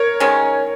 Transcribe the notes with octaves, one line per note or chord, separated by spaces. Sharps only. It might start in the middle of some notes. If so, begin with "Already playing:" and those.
Already playing: A#4 C#5
D#3 G#3 C#4